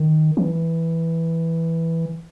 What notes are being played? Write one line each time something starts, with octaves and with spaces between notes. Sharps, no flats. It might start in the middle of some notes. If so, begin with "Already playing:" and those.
Already playing: D#3
E3